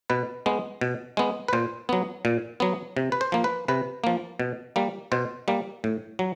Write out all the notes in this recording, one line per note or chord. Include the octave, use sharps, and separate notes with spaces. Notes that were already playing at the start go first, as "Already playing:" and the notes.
B2 B4
G#3 B3
B2
G#3 B3
B4
A#2 C5
F#3 B3
A#2
F#3 B3
C3
B4
C5
F3 A#3
B4
C3 B4
F3 A#3
B2
G3 A#3
B2 C5
G3 A#3
A2
F#3